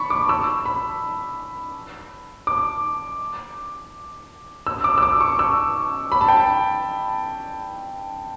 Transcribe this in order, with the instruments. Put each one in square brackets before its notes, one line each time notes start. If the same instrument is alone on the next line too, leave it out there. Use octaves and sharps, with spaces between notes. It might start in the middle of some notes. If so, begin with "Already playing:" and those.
Already playing: [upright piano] A5 B5 C#6
D6
E6
B5
D6
E6
D6
E6
D6
C#6
E6
B5
A5
G5
A5